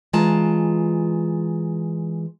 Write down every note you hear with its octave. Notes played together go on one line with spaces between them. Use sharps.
E3 G#3 F4 A5 A#5